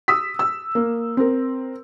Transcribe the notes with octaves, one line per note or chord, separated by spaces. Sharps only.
D#6 E6 B6
E6
A#3
C4 A#4